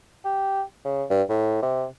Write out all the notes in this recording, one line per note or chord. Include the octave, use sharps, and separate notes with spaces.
G4
C#3
G2
A2
C3